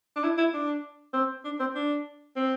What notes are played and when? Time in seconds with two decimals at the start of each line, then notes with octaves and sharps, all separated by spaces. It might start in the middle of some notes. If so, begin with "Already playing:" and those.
0.16 D4
0.23 E4
0.38 E4
0.54 D4
1.14 C4
1.44 D4
1.60 C4
1.75 D4
2.36 C4